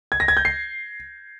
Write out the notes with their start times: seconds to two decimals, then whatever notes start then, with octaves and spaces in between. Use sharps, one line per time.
0.12 G#6
0.20 A#6
0.28 G#6
0.37 G6
0.45 C7